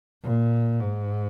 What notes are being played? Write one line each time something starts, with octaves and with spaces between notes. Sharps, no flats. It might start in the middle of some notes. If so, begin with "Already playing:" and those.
A#2
G#2